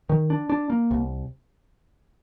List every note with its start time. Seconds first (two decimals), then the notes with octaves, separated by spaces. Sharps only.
0.09 D#3
0.30 D4
0.50 D4
0.70 A#3
0.91 C2